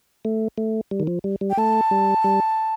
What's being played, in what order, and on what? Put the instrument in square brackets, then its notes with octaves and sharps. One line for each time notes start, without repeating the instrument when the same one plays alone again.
[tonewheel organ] A3
A3
G3
D#3
F3
G3
G3
[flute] G5
[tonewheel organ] A3 [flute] A5
[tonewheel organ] G3
G3